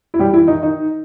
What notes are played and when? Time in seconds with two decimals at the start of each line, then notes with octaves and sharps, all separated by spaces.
0.14 E4
0.19 G3 G4
0.33 E3 E4
0.47 D#3 D#4
0.62 D#3 D#4